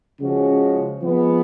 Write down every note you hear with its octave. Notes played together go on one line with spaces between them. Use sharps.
C#3 F3 G#3 C#4 F#4
F3 G#3 B3